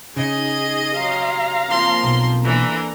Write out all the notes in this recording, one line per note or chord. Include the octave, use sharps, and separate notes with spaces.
C#3 D#4 G#4 D#5
F#3 G4 F5 A#5 C6
F3 A#3 C4 C6
B1
D3 E3 A#3 A#5